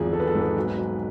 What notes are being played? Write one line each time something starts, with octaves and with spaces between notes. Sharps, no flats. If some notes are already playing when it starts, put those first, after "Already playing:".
Already playing: G#1 E2 F3 G#4
G#1 A4
B4
A4
G#2
B4
B1
B1